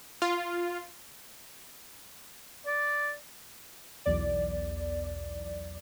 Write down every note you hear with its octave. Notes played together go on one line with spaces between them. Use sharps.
F4
D5
B1 E2 D5